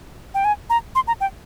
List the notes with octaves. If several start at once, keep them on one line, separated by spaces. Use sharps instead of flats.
G5
G#5
A#5
C6
A#5
G5